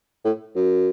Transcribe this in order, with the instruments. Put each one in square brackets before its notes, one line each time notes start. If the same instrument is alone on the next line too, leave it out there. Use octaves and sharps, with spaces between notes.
[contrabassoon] A2
F#2